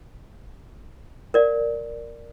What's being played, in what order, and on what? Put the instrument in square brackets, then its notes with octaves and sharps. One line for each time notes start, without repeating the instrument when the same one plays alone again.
[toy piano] A#4 D5 F5